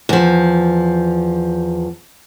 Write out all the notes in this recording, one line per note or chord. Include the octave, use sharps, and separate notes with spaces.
E2 F3